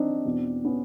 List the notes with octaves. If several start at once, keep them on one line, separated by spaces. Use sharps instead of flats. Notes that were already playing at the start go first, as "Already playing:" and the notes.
Already playing: C4 D4 D#4
E2 B2
B3 C#4